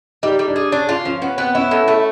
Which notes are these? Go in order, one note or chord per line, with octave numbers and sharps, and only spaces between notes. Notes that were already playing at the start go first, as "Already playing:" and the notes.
G3 D#4
G3
D4
G#4
C#4 D4
C#4 F4
F3 C#4
B3 C#4
B3 C4
C#4 E4
A2
A3